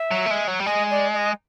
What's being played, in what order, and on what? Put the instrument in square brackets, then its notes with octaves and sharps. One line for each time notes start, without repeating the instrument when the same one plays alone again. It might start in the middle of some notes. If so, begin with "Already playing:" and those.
Already playing: [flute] E5
[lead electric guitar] F#3
A3
G#3
F#3
G3
[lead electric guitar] G#3 [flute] D#5
[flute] D5
D#5